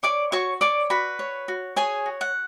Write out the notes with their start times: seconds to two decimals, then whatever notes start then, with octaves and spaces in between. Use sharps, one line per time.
0.03 C#5 D5 D6
0.32 F#4 C#5 C#6
0.61 C#5 D5 D6
0.90 F#4 B4 B5
1.19 C#5
1.48 F#4
1.76 G#4 C#5 G#5
2.06 F#4
2.21 F#5